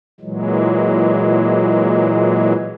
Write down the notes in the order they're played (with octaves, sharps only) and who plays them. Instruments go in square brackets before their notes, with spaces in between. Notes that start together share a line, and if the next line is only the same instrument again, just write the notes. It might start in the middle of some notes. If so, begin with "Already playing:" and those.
[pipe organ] A#2 E3 F#3 G#3